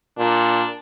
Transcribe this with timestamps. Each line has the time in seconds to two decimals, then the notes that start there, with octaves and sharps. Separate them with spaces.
0.19 A#2 D4